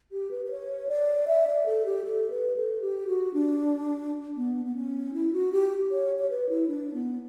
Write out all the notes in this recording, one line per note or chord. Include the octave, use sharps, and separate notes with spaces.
G4
B4
B4
C#5
D5
E5
D5
A4
G4
A4
B4
A4
G4
F#4
D4
B3
B3
C#4
E4
F#4
G4
C#5
C#5
B4
E4
D4
B3